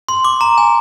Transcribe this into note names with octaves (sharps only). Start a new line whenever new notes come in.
C6
D6
A#5
G#5